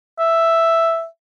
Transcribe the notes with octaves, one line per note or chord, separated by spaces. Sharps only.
E5